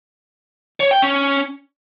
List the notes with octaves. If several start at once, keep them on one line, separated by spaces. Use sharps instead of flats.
C#5
G5
C#4